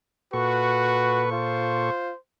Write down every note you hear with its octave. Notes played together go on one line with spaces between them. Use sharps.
A#2 F#4 A4 B4 C#6
F4 C5